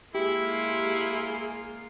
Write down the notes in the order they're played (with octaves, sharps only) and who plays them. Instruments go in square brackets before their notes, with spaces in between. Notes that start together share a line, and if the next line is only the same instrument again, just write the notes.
[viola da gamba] G#3 A#3 F4 [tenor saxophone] E4 [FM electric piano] G4 [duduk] G#4